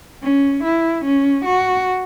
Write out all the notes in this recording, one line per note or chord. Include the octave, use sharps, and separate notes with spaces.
C#4
E4
C#4
F#4